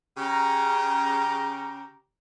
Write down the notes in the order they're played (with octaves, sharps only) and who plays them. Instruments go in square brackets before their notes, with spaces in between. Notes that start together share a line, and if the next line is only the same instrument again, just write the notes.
[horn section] C#3 G4 A#5